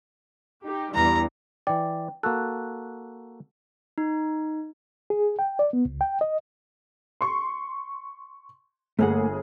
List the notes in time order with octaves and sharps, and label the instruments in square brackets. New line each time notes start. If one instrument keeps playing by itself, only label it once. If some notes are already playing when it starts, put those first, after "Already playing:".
[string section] D#4 G4
[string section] E2 G2 E3 [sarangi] A#5
[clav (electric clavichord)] E3 D5 [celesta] G5
[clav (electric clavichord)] A#3 F#4 A4 [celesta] F#6
[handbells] D#4
[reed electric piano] G#4
G5
D5
B3
C#2
G5
D#5
[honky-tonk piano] C6 C#6
[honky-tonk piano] G1 G#4 [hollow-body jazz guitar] A3 A#3 F#5